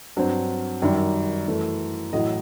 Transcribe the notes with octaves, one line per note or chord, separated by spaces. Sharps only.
G2 F#3 C4
F#2 D#3 G3
F#2 E3 A3
A1 A2 F#3 D#5